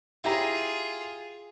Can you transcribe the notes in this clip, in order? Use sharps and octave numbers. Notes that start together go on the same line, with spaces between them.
E4 F4 G4 G#4 A#5